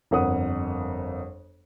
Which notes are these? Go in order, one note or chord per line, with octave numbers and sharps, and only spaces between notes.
G1 F2 A#4 F#5 D#6